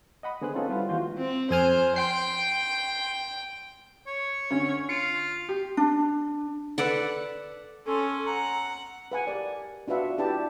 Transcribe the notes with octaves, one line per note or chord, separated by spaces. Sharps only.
D#5 F#5 B5 D#6
D3 B3 G#4 C5 D#6 F#6
C4 C#4 D#4 F4 A4 B4
G3 E4 F4 B4 C5 F#5
D#2 E3 G#3 F4 F#4 G6
C4
F2 C5 G#5 F6
G5 C6 C7
C#5
D3 C#4
F4 C#7
G4
D4
A4 B4 D5 F#5
C#4 A4 C6
F#5 A#5
B4 F#5 G#5
G4 A#4 D5
D4 F4 F#4 B4 E5 F#5
D4 E4 G4 B4 A5